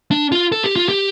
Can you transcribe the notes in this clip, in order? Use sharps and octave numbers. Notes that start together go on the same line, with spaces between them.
D4
F4
A4
G4
F4
G4